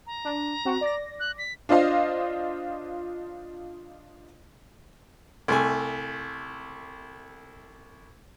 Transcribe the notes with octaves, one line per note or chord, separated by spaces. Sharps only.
A#5
D4
C4 F#4
D5 A#6
F#6
B6
D4 F4 C5 D#5 F5
C2 A3 G#5